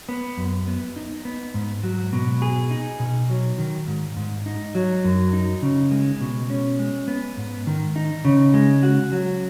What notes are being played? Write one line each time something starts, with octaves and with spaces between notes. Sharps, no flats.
B3
F#2
B3
D#4
B3
G#2
F#3
B2
G#4
D#4
B2
F#3
D#3
G#2
G#2
D#4
F#3
F#2
D#4
C#3
G#3
B2
C#4
G#3
B3
G#2
D#3
D#4
C#3
G#3
F#4
F#3